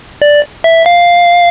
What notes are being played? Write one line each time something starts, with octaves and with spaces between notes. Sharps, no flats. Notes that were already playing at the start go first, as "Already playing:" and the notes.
D5
E5
F5